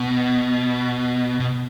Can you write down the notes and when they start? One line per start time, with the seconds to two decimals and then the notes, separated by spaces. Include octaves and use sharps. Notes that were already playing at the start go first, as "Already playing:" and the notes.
Already playing: B2
1.40 B2